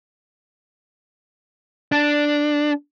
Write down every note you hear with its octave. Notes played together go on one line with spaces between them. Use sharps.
D4